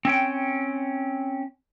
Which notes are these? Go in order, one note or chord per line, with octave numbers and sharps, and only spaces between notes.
C4 C#4 G5